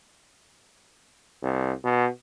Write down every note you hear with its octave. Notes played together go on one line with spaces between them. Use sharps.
C2
B2